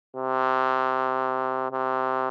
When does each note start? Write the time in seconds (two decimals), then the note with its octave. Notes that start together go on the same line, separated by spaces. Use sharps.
0.17 C3
1.72 C3